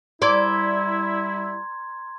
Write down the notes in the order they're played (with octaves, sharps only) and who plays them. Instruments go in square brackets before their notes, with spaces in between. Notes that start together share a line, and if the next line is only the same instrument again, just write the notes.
[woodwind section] G3 E4 [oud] D5 [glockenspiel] A#5 C6 G#6